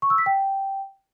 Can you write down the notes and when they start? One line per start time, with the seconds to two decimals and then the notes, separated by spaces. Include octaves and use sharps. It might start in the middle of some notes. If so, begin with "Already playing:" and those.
0.02 C#6
0.10 E6
0.18 B6
0.26 G5